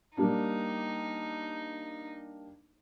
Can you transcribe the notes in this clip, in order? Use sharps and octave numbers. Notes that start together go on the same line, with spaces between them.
G3 A#3 D4 D#4